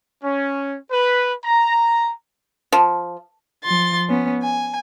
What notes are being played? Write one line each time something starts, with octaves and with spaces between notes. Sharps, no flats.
C#4
B4
A#5
F3
F3 C6 A6
B3 C#4
G#5